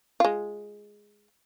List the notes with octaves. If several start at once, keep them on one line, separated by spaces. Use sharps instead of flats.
G#3 F4